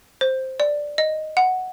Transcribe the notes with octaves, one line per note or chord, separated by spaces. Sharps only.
C5
D5
D#5
F#5